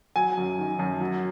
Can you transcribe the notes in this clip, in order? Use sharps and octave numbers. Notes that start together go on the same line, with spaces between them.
F#3 G#5
F#2
D#3
F#2
F#3